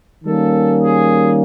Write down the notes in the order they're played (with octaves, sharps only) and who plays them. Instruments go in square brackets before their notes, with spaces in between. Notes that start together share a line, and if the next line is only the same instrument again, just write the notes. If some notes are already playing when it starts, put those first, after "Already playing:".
[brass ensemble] D#3 G3 A#3 C#4 A4
G#4